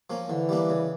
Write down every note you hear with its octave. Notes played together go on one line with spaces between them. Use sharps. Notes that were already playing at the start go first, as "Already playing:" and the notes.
F3 A#3 C#4
D3 E3
G3 A#3 D4
C#3